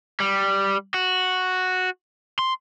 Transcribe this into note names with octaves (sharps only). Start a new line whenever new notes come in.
G3
F#4
C6